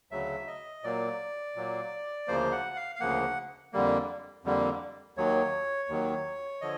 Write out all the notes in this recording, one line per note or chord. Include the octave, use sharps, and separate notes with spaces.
D2 C#3 F#3 E5
D#5
A#2 F#3 A#3 D5
A#2 F#3 A#3
D2 C#3 F3 A#3 C5
F#5
F5
F5
D2 C#3 F3 A#3 F#5
F2 D3 G3 A#3
F2 D3 G3 A#3
D#2 D#3 F#3 C#5
D#2 D#3 F#3
D3 F3 D#5